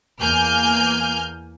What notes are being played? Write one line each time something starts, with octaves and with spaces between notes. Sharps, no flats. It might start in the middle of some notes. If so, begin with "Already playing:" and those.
E2 A#3 G#5 F6 G6